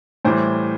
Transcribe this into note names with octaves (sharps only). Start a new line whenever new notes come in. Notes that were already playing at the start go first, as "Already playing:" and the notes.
A2 E3 G3 C5